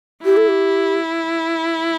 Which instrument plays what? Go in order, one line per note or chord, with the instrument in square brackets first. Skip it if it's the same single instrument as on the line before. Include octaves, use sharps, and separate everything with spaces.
[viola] E4 [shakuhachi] G4
[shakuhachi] A4
G4